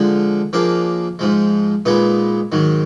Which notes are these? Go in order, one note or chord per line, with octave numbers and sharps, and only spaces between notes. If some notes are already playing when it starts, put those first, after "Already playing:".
Already playing: D3 F3 G#3
F3 A#3 D4 G#4
G#2 F3 G#3
A#2 G#3 B3 D#4 G#4
G#2 D#3 F#3